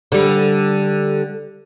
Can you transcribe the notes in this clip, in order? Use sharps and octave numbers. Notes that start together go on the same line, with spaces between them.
D3 G3